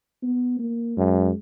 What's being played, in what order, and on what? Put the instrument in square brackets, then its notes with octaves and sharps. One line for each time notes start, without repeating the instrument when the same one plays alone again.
[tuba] B3
A#3
[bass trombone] F#2 [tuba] G#3